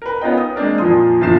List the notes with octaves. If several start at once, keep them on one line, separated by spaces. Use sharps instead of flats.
A#4 B4
B3 C#4 D#4 F4 D#5 G5
D#6
G#3 A#3 C4 D4 A#4
F2 A#2 F3 C6 D#6
G1 A#2 F3 A6 C7 E7